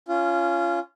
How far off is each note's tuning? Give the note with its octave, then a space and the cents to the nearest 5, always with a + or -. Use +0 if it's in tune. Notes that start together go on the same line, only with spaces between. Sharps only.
C#4 +5 F4 -20